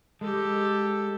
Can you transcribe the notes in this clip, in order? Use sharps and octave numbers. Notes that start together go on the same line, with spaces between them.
G#3 G4 A4